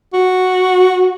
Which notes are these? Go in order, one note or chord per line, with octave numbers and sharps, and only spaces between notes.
F#4